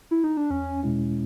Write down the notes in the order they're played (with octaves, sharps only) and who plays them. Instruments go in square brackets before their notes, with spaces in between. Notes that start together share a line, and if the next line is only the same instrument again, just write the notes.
[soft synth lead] E4
D#4
D4
[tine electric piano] E2 [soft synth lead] C#4
[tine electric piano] B2 G#3 C#4 E4